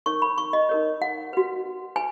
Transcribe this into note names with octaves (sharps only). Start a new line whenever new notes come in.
D#4 A#4 C#5 C#6
B5
C#6
D#5
D#4 A#4 C#5
F#5
F#4 B4
B4 G#5